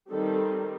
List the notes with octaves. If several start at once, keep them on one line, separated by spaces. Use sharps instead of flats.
D#3 G3 C4 A4